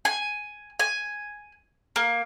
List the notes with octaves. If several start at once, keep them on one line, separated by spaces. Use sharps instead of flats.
G#5
G#5
A#3